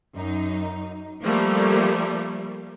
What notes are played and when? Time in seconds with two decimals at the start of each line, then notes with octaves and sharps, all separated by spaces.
0.16 F#2 D#4
1.21 F3 G3 A3 A#3